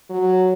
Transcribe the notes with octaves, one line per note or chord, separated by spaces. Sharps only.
F#3